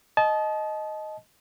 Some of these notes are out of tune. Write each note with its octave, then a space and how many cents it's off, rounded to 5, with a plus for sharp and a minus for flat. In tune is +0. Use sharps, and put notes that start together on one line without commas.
D#5 +0 A5 -30